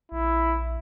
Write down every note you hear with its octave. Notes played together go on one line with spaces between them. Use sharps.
A#1 E4